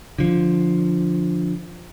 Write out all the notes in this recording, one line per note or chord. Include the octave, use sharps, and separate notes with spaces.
D3 F3